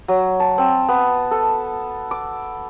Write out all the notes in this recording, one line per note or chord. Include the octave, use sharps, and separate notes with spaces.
F#3
A5
C4
B3
A4
D6